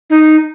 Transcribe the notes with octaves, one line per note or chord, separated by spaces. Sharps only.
D#4